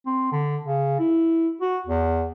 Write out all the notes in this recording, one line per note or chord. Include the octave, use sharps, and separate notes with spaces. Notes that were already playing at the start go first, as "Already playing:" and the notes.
C4
D3
C#3
E4
F#4
E2